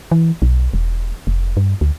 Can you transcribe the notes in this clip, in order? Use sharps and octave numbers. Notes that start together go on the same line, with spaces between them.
E3
B1
E1
F1
G2
D2